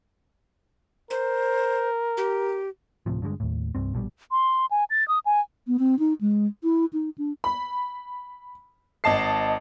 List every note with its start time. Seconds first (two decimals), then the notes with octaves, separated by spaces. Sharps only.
1.10 A#4 C5
2.17 G4
3.06 D1 A2 C3 F3
3.22 G2 D3 F#3 G#3
3.40 D#2 A2
3.75 C2 G2 C4
3.94 A#1 B2 D3 G3
4.31 C6
4.71 G#5
4.90 A6
5.08 D#6
5.26 G#5
5.67 B3
5.79 C4
5.99 D#4
6.21 G#3
6.63 E4
6.93 D#4
7.18 D4
7.44 B5
9.04 G#1 D#5 A5 C7